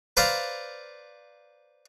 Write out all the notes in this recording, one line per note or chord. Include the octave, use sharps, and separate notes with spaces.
B4 C5 D5 F5 A#5